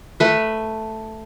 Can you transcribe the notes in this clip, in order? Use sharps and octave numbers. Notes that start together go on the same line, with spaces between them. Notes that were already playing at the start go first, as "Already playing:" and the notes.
A3 B4